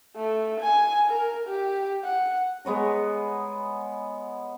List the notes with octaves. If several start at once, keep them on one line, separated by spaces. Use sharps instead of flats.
A3
G#5
A#4
G4
F#5
G#3 B3 C#5 A#5